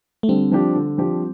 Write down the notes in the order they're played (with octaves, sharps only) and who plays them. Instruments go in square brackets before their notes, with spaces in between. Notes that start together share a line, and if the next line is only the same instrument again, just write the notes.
[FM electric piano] A3
[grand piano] D3 [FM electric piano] G3 C4
[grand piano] F3 D4 G4
D3
F3 D4 G4